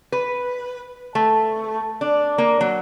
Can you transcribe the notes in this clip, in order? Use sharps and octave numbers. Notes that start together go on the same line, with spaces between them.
B4
A3
D4
A#3
F#3